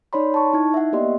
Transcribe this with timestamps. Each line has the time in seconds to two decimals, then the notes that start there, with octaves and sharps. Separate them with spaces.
0.13 D#4 C#5 D5 B5 C6
0.34 A5 C#6
0.53 D#4 E4 G#6
0.74 E5 F#5
0.93 A#3 B3 G4 D5 D#5 C6